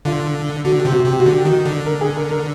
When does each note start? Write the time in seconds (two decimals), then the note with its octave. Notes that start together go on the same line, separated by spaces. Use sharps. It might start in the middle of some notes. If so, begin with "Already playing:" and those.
0.05 D3 F4
0.65 D3 F#4
0.79 G4
0.85 C3
0.92 F#4
1.05 C3 G4
1.20 F#4
1.26 D3
1.33 G4
1.45 D#3 F#4
1.65 D3
1.85 A#4
2.01 G#4
2.16 A#4
2.31 A#4